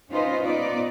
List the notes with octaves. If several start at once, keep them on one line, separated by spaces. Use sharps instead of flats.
C#4 D#4 F4 B4 C5
B3 D#4 F4 B4 D5